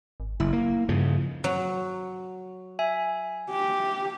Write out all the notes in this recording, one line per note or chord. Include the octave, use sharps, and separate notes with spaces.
G#1
F#1 E4
A#3
G2 C#3 F3
F#3
E5 G#5
G4